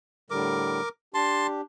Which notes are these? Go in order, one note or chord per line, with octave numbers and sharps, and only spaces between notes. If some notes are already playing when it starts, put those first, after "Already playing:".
A2 D3 G3 A#4 D6
D4 G4 A5 C6